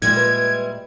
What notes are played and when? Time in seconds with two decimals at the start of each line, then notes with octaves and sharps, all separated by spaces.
0.02 A#2 G3 G#3 E4 G#6
0.17 B4